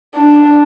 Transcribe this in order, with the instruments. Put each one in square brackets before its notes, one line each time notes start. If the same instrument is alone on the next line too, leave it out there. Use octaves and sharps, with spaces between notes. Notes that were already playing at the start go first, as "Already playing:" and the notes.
[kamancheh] D4